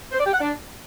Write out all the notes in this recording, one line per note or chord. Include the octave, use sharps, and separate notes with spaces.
C5
D5
G4
F#5
D4